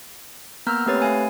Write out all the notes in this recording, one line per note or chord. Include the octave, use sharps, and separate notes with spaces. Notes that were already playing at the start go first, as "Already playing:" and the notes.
A#3 B3 A#5 E6 F6 G6
A3 C4 G4 B4 C#5 A6
A3 F5 G#5